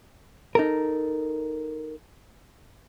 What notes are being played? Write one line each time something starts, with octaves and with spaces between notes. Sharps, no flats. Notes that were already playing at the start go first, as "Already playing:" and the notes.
D#4 A4 A#4